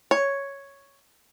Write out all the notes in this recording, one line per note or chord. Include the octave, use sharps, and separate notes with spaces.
C#5